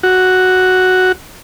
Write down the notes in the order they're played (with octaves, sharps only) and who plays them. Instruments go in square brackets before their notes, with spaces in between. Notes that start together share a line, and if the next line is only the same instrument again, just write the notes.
[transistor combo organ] F#4